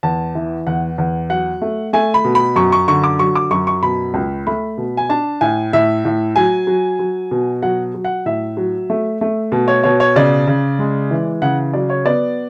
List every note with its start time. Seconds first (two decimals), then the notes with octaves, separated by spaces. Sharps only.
0.03 E2 A5
0.35 E3
0.67 E2 F#5
0.98 E2
1.30 F#3 F#5
1.62 A3
1.93 A3 G#5
2.14 B5
2.24 B2
2.35 B5
2.56 F#2 C#6
2.72 C#6
2.88 D3 C#6
3.04 D6
3.19 F#3 C#6
3.35 D6
3.51 F#2 C#6
3.67 C#6
3.82 B2 B5
4.14 C#2
4.47 A3 B5
4.78 B2
4.97 G#5
5.09 D4 A5
5.41 A2 G#5
5.73 A2 E5
6.05 A2
6.36 F#3 G#5
6.67 F#3
6.99 F#3
7.31 B2
7.62 F#3 F#5
7.95 F#3
8.05 F#5
8.26 A2 E5
8.57 F#3
8.90 A3
9.21 A3
9.52 B2
9.68 C#5
9.84 B2 C#5
10.00 C#5
10.16 C#3 D5
10.47 C#3
10.79 G#3
11.11 E3
11.42 C#3 F#5
11.73 F#3 D5
11.90 C#5
12.05 B3 D5